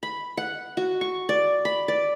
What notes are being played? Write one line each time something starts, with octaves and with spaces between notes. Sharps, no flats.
B5
F#5
F#4
C#6
D5
B5
D5